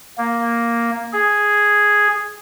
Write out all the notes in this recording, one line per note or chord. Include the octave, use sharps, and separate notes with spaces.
A#3
G#4